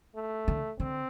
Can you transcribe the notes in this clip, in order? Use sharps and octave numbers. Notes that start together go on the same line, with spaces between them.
A3
D3
D3 C4